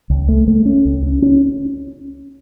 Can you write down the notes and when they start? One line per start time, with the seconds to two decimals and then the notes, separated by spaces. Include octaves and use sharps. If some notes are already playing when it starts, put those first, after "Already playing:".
0.10 C#2
0.28 A3
0.48 A3
0.66 C#4
0.85 C#2
1.03 C#4
1.22 C#4